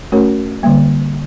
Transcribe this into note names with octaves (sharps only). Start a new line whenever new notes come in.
A3 C#4 F#4 A#4 C#5
D3 G3 A#3